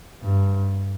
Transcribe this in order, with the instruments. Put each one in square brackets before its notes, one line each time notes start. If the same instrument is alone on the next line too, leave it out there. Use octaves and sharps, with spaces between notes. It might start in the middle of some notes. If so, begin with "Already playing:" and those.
[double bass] G2